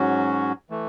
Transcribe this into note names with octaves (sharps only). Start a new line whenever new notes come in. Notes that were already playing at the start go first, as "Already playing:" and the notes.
Already playing: G#2 F#3 C#4 F#4
E3 A3